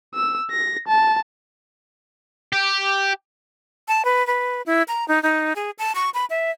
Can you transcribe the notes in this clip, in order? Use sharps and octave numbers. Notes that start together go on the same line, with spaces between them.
E6
A#6
A5
G4
A5
B4
B4
E4
A#5
D#4
D#4
G#4
A5
C#6
B5
E5